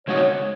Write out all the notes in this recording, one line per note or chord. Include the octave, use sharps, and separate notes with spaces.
C#3 G#3 D#4 F#4 C#5